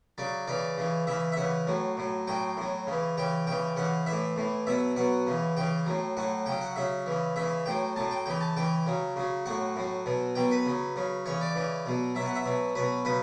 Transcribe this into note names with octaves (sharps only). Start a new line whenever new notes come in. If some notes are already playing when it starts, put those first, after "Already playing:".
C#3 F#3 D5
C#3 E3 D5
C#3 E3
C#3 E3 E5
E5
C#3 E3 F#5
A2 F#3
A2 F#3
A2 F#3 G5
A2 F#3
C#3 E3
C#3 E3 G5
C#3 E3 G5
C#3 E3 F#5
A2 E3 E5
A2 E3
B2 F#3 E5
B2 F#3 F#5
C#3 E3
C#3 E3 G5
A2 F#3
A2 F#3 F#5
C#3 F#3 G5
F#5
C#3 F#3 E5
C#3 E3
C#3 E3 E5
A2 F#3 G5
A2 F#3 A5
G5
C#3 E3 G5
A5
C#3 E3 G5
C#3 F#3
C#3 F#3
A2 F#3 F#5
A2 F#3
B2 F#3
B2 F#3 G5
B4
C#3 F#3
C#3 F#3
C#3 E3 C#5
D5
C#3 E3
B2 F#3
B2 F#3 E5
F#5
E5
B2 F#3
B2 F#3 B4
C#3 F#3 B4